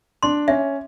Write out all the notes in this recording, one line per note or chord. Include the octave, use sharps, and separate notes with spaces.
D4 C6
C#4 E5